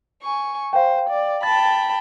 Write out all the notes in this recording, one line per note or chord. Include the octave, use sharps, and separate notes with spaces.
G#5 C#6
C5 F5 G5
D5
G5 A5 B5 A6